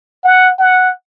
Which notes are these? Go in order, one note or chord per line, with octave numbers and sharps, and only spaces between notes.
F#5
F#5